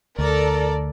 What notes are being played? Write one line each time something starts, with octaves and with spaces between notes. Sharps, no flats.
D2 A4 A#4 D5